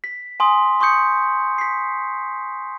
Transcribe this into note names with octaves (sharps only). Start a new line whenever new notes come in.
B6
G#5 C6 D#6
C6 C#6 D#6 G6 C#7
B6 C7